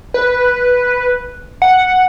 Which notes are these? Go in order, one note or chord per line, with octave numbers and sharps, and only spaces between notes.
B4
F#5